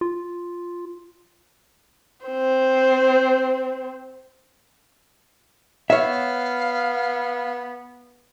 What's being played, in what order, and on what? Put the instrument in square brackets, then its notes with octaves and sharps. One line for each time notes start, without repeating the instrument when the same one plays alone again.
[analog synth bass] F4
[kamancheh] C4 C5
[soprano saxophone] B3 [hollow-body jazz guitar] C#5 E5 [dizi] F5